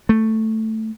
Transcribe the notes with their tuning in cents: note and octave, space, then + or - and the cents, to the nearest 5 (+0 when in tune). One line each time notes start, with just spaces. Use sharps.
A3 +5